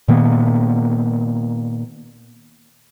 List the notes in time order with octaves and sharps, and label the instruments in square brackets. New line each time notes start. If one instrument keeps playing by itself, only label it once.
[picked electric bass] A#2 D#3 A#3 B3